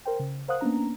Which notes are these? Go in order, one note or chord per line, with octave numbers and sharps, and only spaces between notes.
A#4 C5 G5
C#3
A#4 C5 F5 F#5 D#6 F#6
A#3 B3 C#4 D4 A#5